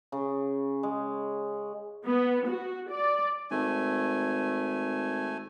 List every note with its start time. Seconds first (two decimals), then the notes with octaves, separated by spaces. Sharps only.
0.12 C#3
0.83 G#3
2.05 B3
2.48 F#4
2.90 D5
3.51 G#1 A3 G#5